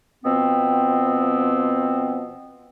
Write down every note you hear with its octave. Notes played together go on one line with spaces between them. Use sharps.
B2 F3 B3 C4